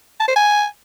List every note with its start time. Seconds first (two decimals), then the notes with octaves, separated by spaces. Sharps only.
0.20 A5
0.28 C5
0.36 G#5